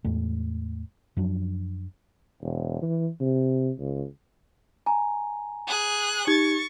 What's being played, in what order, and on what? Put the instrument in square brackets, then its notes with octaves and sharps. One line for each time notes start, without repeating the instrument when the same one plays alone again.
[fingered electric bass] E2 A2 G#3 A3
F#2 F3 F#3 D4
[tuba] E1
E3
C3
C#2
[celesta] G#5 A#5
[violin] G#4 F#6
[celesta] D#4 G4 G#6 [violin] C#6 A6